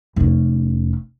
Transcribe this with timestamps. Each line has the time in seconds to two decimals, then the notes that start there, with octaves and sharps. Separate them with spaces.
0.16 F1 C#4